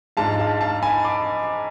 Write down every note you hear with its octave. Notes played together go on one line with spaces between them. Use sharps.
G#2 G#3 D4 F4 F5 A5
F5 A5
F5 A5
G#5 B5
B5 D6